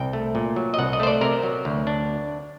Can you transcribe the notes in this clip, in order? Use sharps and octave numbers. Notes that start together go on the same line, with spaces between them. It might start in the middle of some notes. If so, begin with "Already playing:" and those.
Already playing: C2 G5
A3
A#2
F#3
D#5
C2 F#5
D#5
A3 C5
D5
C3 A#4
F#3
D2
D4